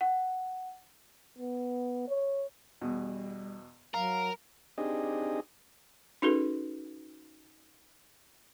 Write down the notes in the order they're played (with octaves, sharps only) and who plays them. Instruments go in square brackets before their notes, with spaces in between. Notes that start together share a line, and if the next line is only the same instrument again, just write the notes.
[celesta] F#5
[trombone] B3
C#5
[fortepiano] E2 B2 [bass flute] G3
[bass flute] F#3 [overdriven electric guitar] A#4 [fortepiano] F5
[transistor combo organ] C4 D4 D#4 G4 G#4 D#5
[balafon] C#4 D#4 F#4 G#4 A4 B4